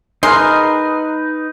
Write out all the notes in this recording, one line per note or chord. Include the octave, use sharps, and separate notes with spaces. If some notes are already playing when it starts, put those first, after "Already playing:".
G#3 D#4 A#4 B4 C6